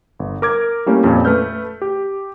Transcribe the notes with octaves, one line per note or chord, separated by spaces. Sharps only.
G1
A#4 D6 G#6
G3 A3 A#3 C#4 E4 G4
F2 A#2 C#4
A3 B4 F6 G6
G4